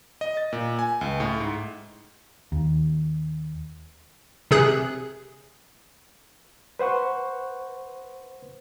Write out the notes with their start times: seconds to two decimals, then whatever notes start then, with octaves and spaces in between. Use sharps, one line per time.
0.21 D#5
0.37 A6
0.53 A#2
0.79 G#5
1.01 C#2
1.20 A2
1.40 G#2
2.52 D#2
4.51 C3 G#4 F#6
6.79 B4 C5 F#5 C#6